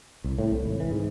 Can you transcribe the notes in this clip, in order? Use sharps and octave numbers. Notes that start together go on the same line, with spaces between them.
C2
A2
C2
G#1
E3
G#2